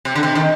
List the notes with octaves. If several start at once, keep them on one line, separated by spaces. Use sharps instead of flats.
C3
D3
C3
D#3